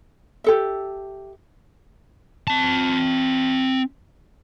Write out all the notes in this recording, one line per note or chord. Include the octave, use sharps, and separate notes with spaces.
G4 A4 E5
C4 A5